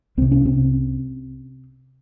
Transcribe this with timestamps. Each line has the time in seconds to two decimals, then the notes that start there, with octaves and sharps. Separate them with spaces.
0.17 C2 C3 C4
0.31 C#4
0.45 C3 C4